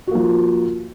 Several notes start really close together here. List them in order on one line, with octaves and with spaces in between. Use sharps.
F#4 A#3 F3